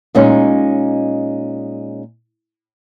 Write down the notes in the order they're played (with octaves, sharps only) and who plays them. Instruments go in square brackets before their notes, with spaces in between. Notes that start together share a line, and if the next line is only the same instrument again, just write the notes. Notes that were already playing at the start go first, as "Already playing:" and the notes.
[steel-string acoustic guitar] A#2 G#3 C#4 D#4